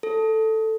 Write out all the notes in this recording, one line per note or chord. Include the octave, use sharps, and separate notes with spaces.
A4